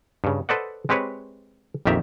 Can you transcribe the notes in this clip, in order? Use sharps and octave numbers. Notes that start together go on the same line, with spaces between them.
G2 C#3
A4 B4 C5 D5 D#5 F#5
G#3 C4 G4 B4 C#5
A#1 F2 D#3 G4 E5 A#5